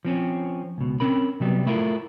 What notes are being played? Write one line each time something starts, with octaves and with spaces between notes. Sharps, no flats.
F3 C4 C#4
C#2 B2
C4 C#4 A#4 B5
C3 F#3 G3 B3
A3 E4 F4 A#4